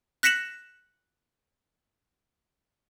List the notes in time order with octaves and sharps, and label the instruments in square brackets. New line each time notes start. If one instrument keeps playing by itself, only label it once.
[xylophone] F#6 A#6 B6 C#7 E7 F#7